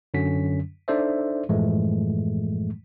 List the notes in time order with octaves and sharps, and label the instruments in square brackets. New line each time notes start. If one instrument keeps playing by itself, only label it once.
[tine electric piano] F#2 D3 F#3 C#4 B6
D4 D#4 A4 C5 D5 E5
F#2 A2 E3 F3 G#3 A3